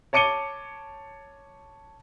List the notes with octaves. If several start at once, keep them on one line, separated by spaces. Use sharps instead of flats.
C#5 A5 D6 C#7 D#7 G7